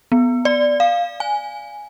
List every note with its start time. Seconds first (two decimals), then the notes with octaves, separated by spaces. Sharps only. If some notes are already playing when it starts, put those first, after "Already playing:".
0.12 B3
0.45 D5
0.80 F5
1.20 G#5